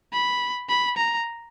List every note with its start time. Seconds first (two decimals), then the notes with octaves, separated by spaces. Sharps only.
0.13 B5
0.69 B5
0.97 A#5